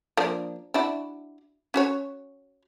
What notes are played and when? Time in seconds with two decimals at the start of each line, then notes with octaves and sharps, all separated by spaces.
0.17 F3 A#3 D4
0.74 D4 E4 F#4
1.74 C#4 F#4 C#5